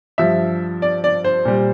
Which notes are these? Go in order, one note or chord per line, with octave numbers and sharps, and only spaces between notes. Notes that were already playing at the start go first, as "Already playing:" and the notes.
G2 F3 E5
D5
D5
C5
A#2 G3